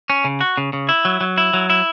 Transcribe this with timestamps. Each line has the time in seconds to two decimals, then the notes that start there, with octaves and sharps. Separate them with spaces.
0.10 C#4
0.24 C#3
0.41 F#4
0.57 C#3
0.73 C#3
0.89 E4
1.05 F#3
1.21 F#3
1.38 E4
1.54 F#3
1.70 E4